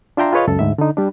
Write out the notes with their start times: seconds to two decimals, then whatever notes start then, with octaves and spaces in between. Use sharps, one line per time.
0.17 D4 F4 E5 G5 A#5 C6
0.33 F4 G#4 B4 C#5 D#5 F5
0.47 C#2 F#2 A4
0.59 D2 G#2 E5
0.78 D3 D#4
0.97 G3 D4